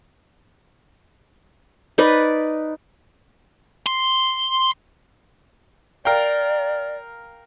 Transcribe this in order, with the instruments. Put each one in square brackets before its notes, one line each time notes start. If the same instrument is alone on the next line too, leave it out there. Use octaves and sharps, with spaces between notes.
[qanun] D#4 B4 D5
[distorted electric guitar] C6
[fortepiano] A#4 F5 G5 [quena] D5